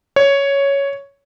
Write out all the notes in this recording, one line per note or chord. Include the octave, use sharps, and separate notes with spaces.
C#5